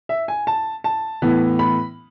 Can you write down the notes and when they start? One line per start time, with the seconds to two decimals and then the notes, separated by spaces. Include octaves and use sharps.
0.09 E5
0.28 G#5
0.47 A5
0.84 A5
1.22 A2 E3 B3
1.59 B5